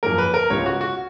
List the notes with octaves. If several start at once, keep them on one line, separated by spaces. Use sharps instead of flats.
F#2 F3 A#3 A#4
B4
A#4
C#2 C#3 G#3 B3 C#5
F#4
F#4